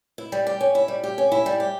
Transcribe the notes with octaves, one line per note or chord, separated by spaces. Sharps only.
E4
G3
G4
C#4
E4
G3
G4
C#4
E4
G3
G4